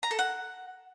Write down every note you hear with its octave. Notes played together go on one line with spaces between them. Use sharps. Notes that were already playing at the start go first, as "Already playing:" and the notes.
A#5
A4
F#5